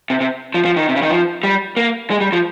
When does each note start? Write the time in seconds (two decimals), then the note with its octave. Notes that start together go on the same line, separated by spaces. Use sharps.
0.10 C3
0.21 C3
0.54 F3
0.65 F3
0.76 D#3
0.89 C3
0.96 C#3
1.02 D#3
1.10 F3
1.43 G3
1.77 A#3
2.10 G#3
2.21 G3
2.32 F3